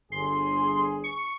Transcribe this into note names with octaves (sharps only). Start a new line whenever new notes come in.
G1 G#4 C6
C#6